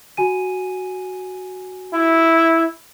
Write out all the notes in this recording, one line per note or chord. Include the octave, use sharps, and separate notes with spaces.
F#4 G#5 D#7
E4